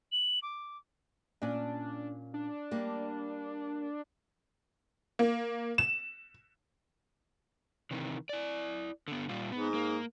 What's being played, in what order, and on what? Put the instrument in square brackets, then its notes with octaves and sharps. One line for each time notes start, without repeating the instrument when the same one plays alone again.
[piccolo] F#7
D6
[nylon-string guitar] A#2 C#4 [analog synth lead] D4
[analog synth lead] D4
[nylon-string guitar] G3 A#3
[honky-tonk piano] A#3
E7
[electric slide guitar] C3 D#3 E3
E4 D5
D3 B3
A#2 G3 F4
[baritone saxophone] G#2 [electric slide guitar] B3
[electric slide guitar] A#3